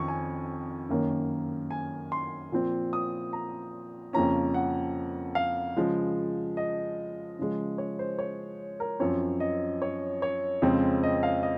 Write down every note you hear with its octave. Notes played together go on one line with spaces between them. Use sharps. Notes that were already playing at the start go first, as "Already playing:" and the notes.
Already playing: F2 D#3 C#4 C#6
G#5
F#2 D#3 A#3 C#4
G#5
C6
A#2 F3 C4
D#6
A#5
F2 C#3 F3 A#3 C#4 A#5
F#5
F5
C#3 F3 G#3
D#5
C#3 F3 G#3
C#5
C5
C#5
A#4
F#2 F3 C4 C#5
D#5
C#5
C#5
F2 C#3 G#3 C4
D#5
F5
D#5